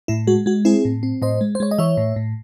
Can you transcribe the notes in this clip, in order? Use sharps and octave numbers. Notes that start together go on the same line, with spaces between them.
A2 E4
G#3 F#4
G#3 F#4
C4 E4 G#4
A2
C4
A2 C5 D#5
G#3
C5
G#3 C#5
D#5
E3 C#5 E5
A2
A2